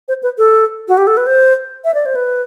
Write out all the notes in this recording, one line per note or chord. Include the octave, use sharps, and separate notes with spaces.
C5
B4
A4
F#4
G4
A4
B4
C5
E5
D5
C5
B4